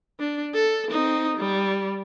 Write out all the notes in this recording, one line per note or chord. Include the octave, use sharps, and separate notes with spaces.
D4
A4
C4 D#4
G3